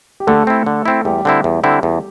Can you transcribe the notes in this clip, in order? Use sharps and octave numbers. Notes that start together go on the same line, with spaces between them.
G4
D3 A3 A4
C4 E4
D3
C4 E4
E2 G3 G4
D3 C4 E4
E2
D3 C4 E4
E2